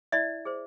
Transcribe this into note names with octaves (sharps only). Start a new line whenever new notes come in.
E4 D5 E5
G#4 C5